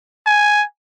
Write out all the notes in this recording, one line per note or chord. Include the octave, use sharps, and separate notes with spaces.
G#5